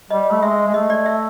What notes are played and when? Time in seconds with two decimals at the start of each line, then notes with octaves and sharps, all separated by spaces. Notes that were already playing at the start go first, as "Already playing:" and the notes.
0.11 G3 D#5
0.31 A3
0.43 G#3 E5
0.68 G#3
0.74 A3 D#5
0.90 D5
1.06 E5